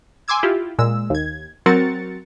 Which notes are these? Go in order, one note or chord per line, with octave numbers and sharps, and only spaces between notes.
G#5 C6 D6 E6 G#6
E4 F4 G4
A#2 G#3 E6
D#2 G#6
F#3 C4 F#4 A#4 A6 C#7